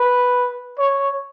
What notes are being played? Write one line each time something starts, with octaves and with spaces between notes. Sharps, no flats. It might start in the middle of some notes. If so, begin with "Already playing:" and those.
Already playing: B4
C#5